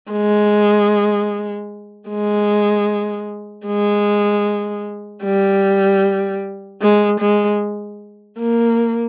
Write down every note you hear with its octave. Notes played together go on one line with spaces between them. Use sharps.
G#3
G#3
G#3
G3
G#3
G#3
A#3